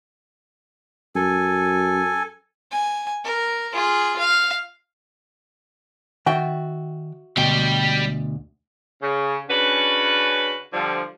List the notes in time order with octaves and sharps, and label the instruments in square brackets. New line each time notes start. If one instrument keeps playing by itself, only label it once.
[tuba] F#2 [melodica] A4 G#5
[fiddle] G#5
A#4
F4 G#4
F5
[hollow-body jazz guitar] D#3 G5 [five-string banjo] F#4 E5
[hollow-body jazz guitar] D2 B2 [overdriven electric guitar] G3 G5
[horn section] C#3
C#3 C#4 D4 F#4 B4
D3 F3 G3